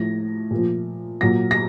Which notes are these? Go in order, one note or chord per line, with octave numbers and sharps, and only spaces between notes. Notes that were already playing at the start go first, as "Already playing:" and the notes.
Already playing: A2 F3 A#6
A#2 F3
A#2 F#3 A#6
A#6